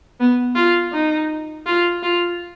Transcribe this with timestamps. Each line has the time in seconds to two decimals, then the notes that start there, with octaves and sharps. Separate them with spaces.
0.20 B3
0.56 F4
0.93 D#4
1.66 F4
2.03 F4